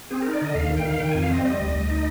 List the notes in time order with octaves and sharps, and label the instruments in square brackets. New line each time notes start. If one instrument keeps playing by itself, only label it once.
[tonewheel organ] C4 G#4
D#4 A#4
D5
D3 D#5
D#2 F5
D#3
G5
D#3 F5
D#3 G5
F2 G#5
F5
C4 D#5
G3 D#5
D2
D2
D#4